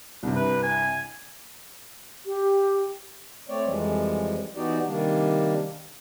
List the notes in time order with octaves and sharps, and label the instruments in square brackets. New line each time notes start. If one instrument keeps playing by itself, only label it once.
[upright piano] C2 G2 C3
[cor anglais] B4
G#5
[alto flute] G4
[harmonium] A3 C4 C#5 D5
F2 E3 F3 G3 G#3
E3 B3 D#4 F#4 G4 D5
C3 D#3 G3 A#3 D4